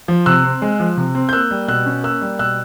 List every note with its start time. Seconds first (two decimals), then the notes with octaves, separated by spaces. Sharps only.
0.08 F3
0.26 C3 E6 F#6
0.44 C4
0.62 G#3
0.80 F3
0.97 C3
1.15 C4
1.29 G6
1.33 A#3 E6 F#6
1.51 G3
1.68 B2 E6 F#6
1.86 C#4
2.04 A#3 E6 F#6
2.22 G3
2.39 B2 E6 F#6